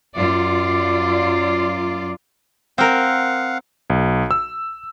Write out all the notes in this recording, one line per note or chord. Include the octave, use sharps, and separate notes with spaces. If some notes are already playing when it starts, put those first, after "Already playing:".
F#2 F4 D5
C4 A#4 F5 F#5
B1
E6